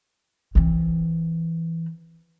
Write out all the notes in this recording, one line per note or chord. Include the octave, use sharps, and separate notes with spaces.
E3 C4